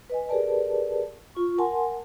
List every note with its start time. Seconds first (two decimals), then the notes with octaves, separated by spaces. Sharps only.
0.10 B4 D#5 G#5
0.29 G4 G#4 A#4 B4 D5 A5
1.35 F4 C#6
1.58 A#4 F#5 G#5 A5 C6